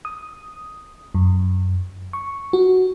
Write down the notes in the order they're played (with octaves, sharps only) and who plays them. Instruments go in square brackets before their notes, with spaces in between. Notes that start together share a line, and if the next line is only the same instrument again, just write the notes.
[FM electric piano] D#6
F#2
C#6
F#4